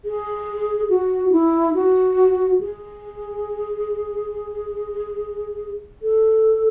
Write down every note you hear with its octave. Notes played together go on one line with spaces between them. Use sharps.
G#4
F#4
F#4
E4
F#4
G#4
A4